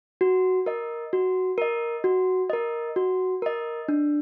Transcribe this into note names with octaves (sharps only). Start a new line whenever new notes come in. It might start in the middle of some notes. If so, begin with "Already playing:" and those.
F#4
A#4 D#5
F#4
A#4 D#5
F#4
A#4 D#5
F#4
A#4 D#5
D4